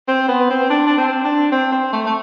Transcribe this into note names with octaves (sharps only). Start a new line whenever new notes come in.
C4
B3
C4
D4
D4
C4
D4
C4
C4
A3
A3